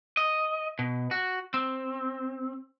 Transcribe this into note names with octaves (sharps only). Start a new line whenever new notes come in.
D#5
B2
F#4
C4